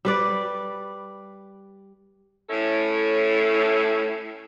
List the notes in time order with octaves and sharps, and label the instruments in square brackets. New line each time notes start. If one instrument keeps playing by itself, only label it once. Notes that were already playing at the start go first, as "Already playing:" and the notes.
[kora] G3 B4 D5
[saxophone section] A2 C#4 E4 A4